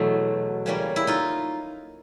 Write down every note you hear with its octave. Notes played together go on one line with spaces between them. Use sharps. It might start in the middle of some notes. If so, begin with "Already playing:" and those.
Already playing: E2 B2 F#3 A3 E4
C#3 E3 G3 A#3 C#4
E4
D#4 F4